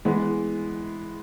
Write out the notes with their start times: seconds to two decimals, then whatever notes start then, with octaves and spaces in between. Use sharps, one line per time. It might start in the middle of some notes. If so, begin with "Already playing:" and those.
0.05 E3 G#3 B3